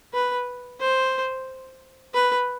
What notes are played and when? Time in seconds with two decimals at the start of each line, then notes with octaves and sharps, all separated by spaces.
0.14 B4
0.80 C5
2.14 B4